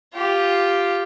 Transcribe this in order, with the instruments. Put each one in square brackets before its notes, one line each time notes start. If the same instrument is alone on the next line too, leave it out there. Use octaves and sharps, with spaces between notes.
[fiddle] F4 G4